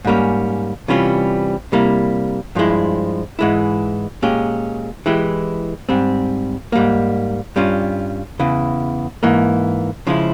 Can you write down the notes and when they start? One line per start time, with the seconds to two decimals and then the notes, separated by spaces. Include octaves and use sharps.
0.05 G#2 G3 A#3 C#4
0.88 C3 E3 G3 C#4 F4
1.72 C3 G3 A#3 E4
2.55 G2 F3 G#3 E4
3.39 G#2 E3 G#3 E4
4.22 A#2 G#3 C#4 G4
5.06 E3 G#3 E4 G4
5.89 G#2 G3 C4
6.72 G#2 G3 A#3
7.56 G2 G3 C#4 F4
8.39 E2 C#3 E3
9.23 G#2 E3 A#3
10.07 C#3 F3 G#3 E4